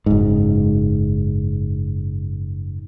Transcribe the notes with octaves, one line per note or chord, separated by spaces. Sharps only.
F#1 G#2